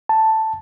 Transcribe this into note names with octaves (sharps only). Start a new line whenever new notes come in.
A5